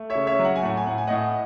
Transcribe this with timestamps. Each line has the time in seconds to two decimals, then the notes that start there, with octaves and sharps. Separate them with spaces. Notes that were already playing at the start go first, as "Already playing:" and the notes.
Already playing: A3
0.10 C#5 E5
0.15 C#3
0.27 C#5 E5
0.39 F#3
0.45 F#5
0.56 G#5
0.63 A2 F#5
0.77 G#5
0.86 A2 F#5
0.98 G#5
1.07 A2 D#5 F#5